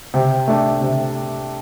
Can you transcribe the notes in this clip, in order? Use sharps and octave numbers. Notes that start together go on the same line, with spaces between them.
C3 G5
A3 D4
C3